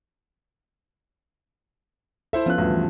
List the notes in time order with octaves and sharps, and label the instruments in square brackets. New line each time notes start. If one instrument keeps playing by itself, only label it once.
[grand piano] E4 C5 E5 [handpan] A4
[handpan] F3 B3 C#4 [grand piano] F4 F#6
[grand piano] D2 G2 [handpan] F4
[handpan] E3